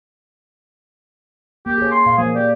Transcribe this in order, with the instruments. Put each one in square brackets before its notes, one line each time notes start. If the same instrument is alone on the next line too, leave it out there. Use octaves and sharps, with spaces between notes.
[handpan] A#3 [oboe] G4
[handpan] G#4 C#5
[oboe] C6
[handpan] A#2 [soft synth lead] F5
[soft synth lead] F3 [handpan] A#3 [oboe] G#4
[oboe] G4 [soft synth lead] D5